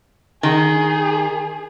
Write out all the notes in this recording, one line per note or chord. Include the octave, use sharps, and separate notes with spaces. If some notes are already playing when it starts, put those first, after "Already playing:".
D#3 G#4